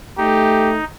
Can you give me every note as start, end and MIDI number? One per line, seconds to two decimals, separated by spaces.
0.18 0.76 57
0.18 0.84 63
0.18 0.70 67